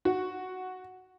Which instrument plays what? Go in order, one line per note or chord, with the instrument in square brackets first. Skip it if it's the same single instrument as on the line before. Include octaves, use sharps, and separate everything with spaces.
[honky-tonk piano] F#4